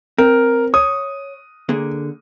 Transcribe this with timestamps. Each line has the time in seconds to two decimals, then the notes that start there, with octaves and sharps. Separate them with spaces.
0.18 C4 A#4
0.74 C#5 D#6
1.69 D3 A#3 G#4